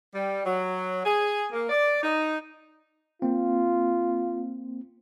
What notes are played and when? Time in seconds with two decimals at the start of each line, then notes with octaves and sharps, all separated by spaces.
0.14 G3
0.45 F#3
1.05 G#4
1.52 A#3
1.69 D5
2.03 D#4
3.22 A#3 C4 F4